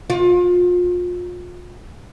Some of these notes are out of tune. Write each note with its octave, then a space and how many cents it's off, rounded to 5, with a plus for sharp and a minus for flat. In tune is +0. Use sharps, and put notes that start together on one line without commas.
F4 +30